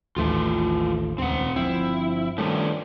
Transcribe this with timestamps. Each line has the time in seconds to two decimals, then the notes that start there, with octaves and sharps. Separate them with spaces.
0.16 A1 D#2 E3 A3 F4
1.18 D#1 C#2 C4 F#5
1.56 G1 F3 C4 E4
2.38 G2 D#3 F3 G3 A3 C#4